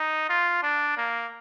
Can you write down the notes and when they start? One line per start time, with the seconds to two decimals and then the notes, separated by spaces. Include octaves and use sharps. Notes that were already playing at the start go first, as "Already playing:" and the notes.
Already playing: D#4
0.29 F4
0.63 D4
0.97 A#3